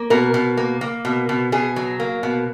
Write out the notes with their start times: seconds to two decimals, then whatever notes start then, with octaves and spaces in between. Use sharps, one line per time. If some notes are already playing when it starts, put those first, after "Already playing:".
Already playing: A#3
0.10 B2 A#4
0.34 B2
0.57 A#3
0.81 A#3
1.05 B2
1.29 B2
1.52 B2 G#4
1.76 F#3
2.00 A#3
2.23 B2